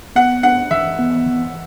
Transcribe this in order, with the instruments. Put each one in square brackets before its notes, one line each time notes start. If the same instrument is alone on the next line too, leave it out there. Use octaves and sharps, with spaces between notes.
[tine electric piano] B3 [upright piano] F#5
[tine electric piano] D4 [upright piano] F#5
[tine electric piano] E3 [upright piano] E5
[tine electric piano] B3
E3